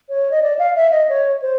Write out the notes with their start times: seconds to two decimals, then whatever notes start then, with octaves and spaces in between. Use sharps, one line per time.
0.09 C#5
0.31 D#5
0.42 D5
0.59 F5
0.76 E5
0.92 D#5
1.09 C#5
1.42 C5